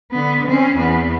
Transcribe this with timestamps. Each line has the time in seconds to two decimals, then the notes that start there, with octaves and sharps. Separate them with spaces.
0.11 D3 B3
0.47 C4 C#4
0.76 E2 B3